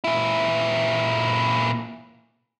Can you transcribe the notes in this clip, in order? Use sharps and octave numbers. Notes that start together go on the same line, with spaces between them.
A#2 E4